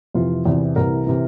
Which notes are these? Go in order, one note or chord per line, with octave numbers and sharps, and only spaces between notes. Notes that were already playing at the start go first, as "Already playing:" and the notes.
F2 C3 E3 F4
E2 C3 E3
C2 C3 E3 A#4
C3 E3